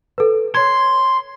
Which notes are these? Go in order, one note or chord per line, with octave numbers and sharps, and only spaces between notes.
A4 B4
C#5 C6 G#6